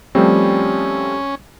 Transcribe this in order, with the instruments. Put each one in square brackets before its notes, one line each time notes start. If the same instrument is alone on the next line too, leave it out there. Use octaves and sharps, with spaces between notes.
[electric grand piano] F3 A3 C4 [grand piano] G3 [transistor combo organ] C#4